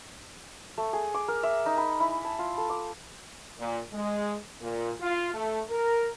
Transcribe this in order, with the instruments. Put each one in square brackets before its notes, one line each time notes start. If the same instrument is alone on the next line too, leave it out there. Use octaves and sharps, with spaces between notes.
[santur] A3
G#4
D6
A#4
E5
D#4
B5
E4
A5
F4
A4
D6
[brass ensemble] A#2
G#3
A#2
F4
A3
A#4